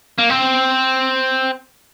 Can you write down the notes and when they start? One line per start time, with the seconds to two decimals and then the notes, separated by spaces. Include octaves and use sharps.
0.18 A#3
0.30 C4